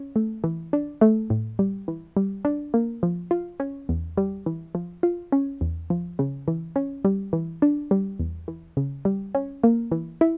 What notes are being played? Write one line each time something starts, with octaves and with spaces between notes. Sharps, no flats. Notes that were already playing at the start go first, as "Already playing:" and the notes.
Already playing: C#4
A3
E3
D4
A3
A2
G3
E3
G3
D4
A#3
F3
F4
C#4
E2
G3
E3
F3
F4
C#4
E2
F3
C#3
E3
C#4
G3
E3
D4
G3
E2
E3
C#3
G3
C#4
A#3
E3
E4